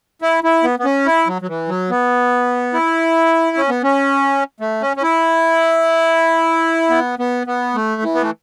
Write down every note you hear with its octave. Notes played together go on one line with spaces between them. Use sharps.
E4
E4
B3
B3
C#4
E4
F#3
F#3
E3
F#3
B3
E4
C#4
B3
C#4
A3
C#4
C#4
E4
B3
B3
B3
A3
E3
B3
A3